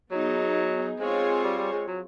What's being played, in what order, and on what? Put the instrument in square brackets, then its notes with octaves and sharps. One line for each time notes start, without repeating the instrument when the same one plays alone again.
[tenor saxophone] F#3 [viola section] B3 D#4 G#4
[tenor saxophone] G#3 [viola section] C4 F4 G#4 C#5
[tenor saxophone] G3
G3
G#3
F#3